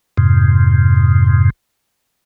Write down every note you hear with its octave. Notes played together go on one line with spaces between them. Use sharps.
F2 G#2 C3